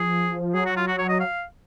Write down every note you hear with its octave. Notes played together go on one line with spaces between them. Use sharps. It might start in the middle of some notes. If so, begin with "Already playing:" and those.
Already playing: F3 G#4
F#3 G#4
F#4
F4
F#4
C#5
D#5
F5